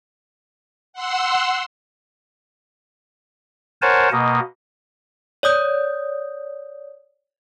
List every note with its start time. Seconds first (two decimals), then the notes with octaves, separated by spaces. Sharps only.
0.93 F#5 C6 E6
3.82 A#4 C5 C#5 F#5 G#5 A5
4.12 B2 A#3 D#5
5.43 C#5 D5 D#6 G6